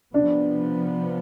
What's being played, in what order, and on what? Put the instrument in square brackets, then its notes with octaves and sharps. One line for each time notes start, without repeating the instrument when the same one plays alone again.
[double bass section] C3 F3 B3 [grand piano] D4